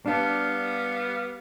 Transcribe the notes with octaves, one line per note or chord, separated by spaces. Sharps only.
G3 B3 D4 F5